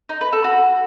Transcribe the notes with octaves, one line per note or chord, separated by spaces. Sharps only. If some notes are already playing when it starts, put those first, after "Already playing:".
D#4
B4
A4
F#4